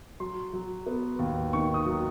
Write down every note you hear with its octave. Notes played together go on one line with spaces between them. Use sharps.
F#3 C6
F#3
B3
D#2
D#3 C#6
D#6
F#3